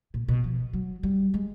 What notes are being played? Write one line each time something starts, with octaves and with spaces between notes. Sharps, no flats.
A#2
B2
F3
F#3
G3
G#3